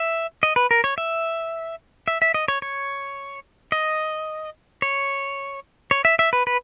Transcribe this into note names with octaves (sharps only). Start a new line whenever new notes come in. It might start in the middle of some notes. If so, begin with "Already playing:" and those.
Already playing: E5
D#5
B4
A#4
C#5
E5
E5
E5
D#5
C#5
C#5
D#5
C#5
C#5
E5
E5
B4
B4